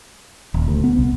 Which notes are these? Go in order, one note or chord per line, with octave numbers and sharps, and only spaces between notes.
D#1
D2
B3
C2